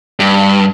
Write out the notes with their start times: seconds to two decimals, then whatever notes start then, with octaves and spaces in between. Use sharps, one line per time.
0.20 G2